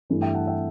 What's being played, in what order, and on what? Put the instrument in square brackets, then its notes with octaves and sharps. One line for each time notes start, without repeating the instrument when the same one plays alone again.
[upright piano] G2 E3 A3
E5 G5
F#5 A5
E5 G5